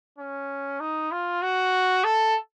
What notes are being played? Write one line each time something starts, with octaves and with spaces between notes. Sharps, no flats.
C#4
D#4
F4
F#4
A4